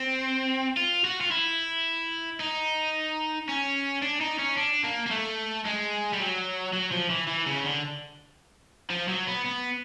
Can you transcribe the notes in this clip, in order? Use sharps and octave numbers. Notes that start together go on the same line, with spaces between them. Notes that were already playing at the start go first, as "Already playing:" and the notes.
Already playing: C4
F4
F#4
F4
E4
D#4
C#4
D4
D#4
C#4
D4
A#3
A#3
A3
G#3
G3
F#3
F#3
F3
E3
E3
C#3
D3
F3
F#3
B3
B3